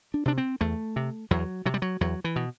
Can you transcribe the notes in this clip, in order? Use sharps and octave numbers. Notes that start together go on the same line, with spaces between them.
D4
C3 D4
C4
E2 A3
C3
E2 F#3
C3 F#3
G3
F#3
E2 F#3
E3
B2